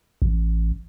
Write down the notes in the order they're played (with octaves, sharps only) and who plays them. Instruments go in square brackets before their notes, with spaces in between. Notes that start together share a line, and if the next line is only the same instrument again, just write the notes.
[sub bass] A1